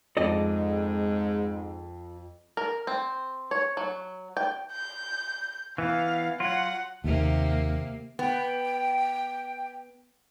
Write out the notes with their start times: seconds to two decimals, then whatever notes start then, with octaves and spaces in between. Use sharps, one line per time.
0.17 F2 G#2 G#3 C4 A4 D5 D#5
2.57 A#4
2.87 C4
3.51 C#5
3.77 F#3
4.37 G5
4.73 G6
5.78 E3 B3 F5
6.40 F#3 F4 F#5
7.04 D#2 C3 A#3
8.19 B3 G5